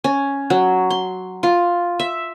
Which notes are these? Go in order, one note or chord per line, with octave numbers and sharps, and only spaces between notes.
C#4
F#3
C6
F4
E5